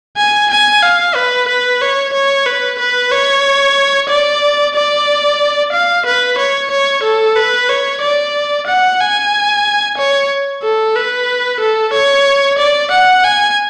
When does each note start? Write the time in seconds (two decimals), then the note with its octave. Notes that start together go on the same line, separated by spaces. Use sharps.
0.18 G#5
0.50 G#5
0.83 F5
1.15 B4
1.48 B4
1.81 C#5
2.14 C#5
2.46 B4
2.79 B4
3.12 C#5
4.09 D5
4.75 D5
5.73 F5
6.06 B4
6.38 C#5
6.71 C#5
7.03 A4
7.36 B4
7.69 C#5
8.01 D5
8.67 F#5
9.00 G#5
9.98 C#5
10.63 A4
10.95 B4
11.61 A4
11.93 C#5
12.59 D5
12.91 F#5
13.24 G#5